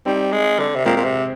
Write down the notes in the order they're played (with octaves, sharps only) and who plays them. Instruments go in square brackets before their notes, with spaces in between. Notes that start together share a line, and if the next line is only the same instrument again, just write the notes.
[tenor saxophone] G3 [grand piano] C4 D#4
[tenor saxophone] G#3
D3
C3
[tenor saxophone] A#2 [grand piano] G#3 C4
[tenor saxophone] A#2
C3